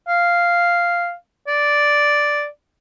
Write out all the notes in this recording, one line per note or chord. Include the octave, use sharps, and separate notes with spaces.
F5
D5